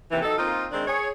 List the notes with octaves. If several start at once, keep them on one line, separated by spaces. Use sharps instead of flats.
D#2 C3 E3
F#3 D#4 A4
A#3 C4 D#4 F4
D#3 G#3 C4 D4
G#4 C#5